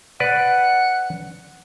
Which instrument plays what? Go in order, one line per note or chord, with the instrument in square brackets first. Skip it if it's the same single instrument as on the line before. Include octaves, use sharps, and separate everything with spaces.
[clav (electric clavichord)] B4 D5 [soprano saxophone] F#5